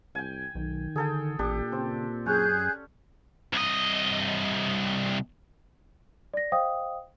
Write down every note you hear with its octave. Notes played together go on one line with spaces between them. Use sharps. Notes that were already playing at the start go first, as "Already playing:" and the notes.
C2 G5 G#5
B1 D#3
D3 G#4 A4 G5
A1 A#2 D4 G4
C#3 C4
F#2 C#4 G#4 F#6 G6
C2 D#5
D5 A#6
C5 D#5 F5 G5 D#6